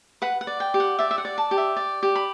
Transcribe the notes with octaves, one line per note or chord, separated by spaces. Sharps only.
B4 F#5
F#5
D5
G5
G4
F#5
D5 E5
E5
F#5
D5
A5
G4
E5
D5
G4
B5